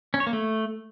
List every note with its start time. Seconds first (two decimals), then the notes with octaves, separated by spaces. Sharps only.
0.14 C#4
0.20 C#5
0.27 A#3
0.33 A3